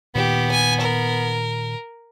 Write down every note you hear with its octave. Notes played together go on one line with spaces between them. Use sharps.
A#2 D#3 B3 G4
G#5
A#4